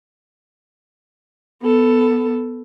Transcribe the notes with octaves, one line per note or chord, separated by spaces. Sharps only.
B3 A4